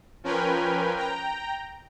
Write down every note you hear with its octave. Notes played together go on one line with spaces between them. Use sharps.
F3 C#4 A#4 B4 G5 G#5
G5 A#5